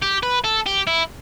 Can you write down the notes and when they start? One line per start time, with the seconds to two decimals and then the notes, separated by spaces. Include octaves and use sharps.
0.02 G4
0.23 B4
0.44 A4
0.66 G4
0.87 E4